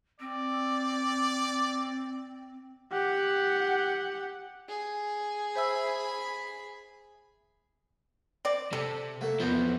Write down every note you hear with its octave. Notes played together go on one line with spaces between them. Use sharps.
C4 D5
G4 F#5
G#4
C5 E5 B5 E6
C4 D5
C3 A4
F#3 A3 A#3
B1 E2 F3 B3 C5